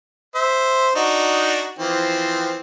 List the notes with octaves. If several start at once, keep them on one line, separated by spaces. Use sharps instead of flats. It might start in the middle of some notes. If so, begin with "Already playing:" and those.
C5 E5
D4 D#4 F#4
E3 F3 C4